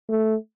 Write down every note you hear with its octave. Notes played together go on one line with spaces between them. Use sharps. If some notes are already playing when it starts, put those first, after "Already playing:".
A3